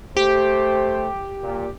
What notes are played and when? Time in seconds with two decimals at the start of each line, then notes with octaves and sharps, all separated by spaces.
0.17 A3 G4 C5
1.42 A#2